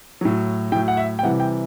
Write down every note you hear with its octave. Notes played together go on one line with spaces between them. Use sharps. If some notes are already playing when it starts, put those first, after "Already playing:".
A2 F#3
A2 F#3 G5
F#5
E5
G5
C3 E3 G3 F#5
G5